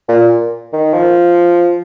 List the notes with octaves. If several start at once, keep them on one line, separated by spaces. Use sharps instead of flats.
A#2
D#3
F3